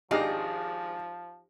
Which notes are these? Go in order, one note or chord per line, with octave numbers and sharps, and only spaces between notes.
G#1 F3 D4 D#4 G4 G#4 D#5 F5